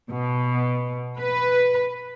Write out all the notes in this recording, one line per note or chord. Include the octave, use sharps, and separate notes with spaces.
B2
B4